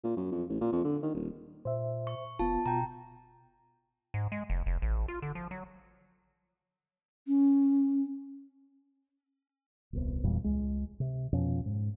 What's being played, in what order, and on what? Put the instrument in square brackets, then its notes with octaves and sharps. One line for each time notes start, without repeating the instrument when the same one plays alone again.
[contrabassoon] A#2
F#2
F2
A1
A#2
F2
D3
D#3
D#1
[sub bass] A#2 [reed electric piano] C5 E5
[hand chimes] C#6
[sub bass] F1 [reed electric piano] B3 F4 [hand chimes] A5
[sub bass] B2 [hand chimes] G5 A#5
[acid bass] G#2
G#3
F1
F1
A1
F4
D3
F3
F#3
[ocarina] C#4
[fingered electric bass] D#1 C2 B3
E1 E2 A#2 G3
C#2 G#3
C3
F2 B2 F3 C#4
G#2